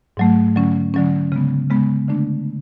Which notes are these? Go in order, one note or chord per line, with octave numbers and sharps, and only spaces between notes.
G#2 F#3 A3
D3 F#3 C#4
D3 F#3 C#4
C#3 G#3 B3
C#3 G#3 B3
D3 A3 D4